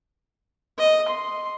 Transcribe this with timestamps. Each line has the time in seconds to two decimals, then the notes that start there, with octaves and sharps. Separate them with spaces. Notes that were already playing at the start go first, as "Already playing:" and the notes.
0.79 D#5
1.08 C6